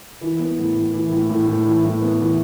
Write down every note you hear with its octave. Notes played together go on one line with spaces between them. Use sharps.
E3
B3
A2
A2
E3
A2
A2
A2
E3
A2
B3
E3